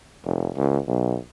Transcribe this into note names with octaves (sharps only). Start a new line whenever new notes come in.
F1
C#2
B1